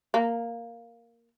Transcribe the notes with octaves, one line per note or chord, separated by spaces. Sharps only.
A#3